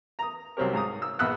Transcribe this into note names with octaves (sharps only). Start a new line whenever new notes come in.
A#5 D#6
C2 F#3 C4 C#4 G4 A#4
G#2 A#5 D#6
E6
A#1 B3 E6 F#6